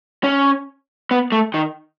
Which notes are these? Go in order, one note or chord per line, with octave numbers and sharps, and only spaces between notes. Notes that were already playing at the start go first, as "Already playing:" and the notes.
C#4
B3
A3
D#3